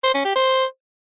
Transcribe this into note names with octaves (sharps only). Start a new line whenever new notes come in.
C5
C#4
G4
C5